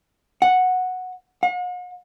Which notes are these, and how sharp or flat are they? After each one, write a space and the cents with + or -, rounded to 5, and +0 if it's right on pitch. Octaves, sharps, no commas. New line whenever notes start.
F#5 -5
F#5 -45